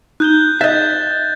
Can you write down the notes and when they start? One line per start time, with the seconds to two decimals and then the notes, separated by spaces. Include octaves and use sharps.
0.20 D#4 F#6 G6 G7
0.61 D#5 E5 G6 A6